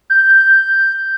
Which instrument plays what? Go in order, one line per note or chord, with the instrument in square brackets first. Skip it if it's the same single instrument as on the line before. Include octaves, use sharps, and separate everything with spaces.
[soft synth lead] G6